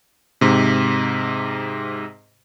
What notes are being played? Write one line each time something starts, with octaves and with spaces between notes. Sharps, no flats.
G#2 C3